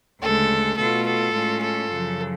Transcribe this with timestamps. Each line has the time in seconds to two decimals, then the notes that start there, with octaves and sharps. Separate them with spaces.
0.21 D2 C#3 G#3 A4
0.77 B2 A3 F4 A4
1.06 A4
1.33 A2 G#3 C#4 F4
1.62 A4
1.90 F#2 C#3 F3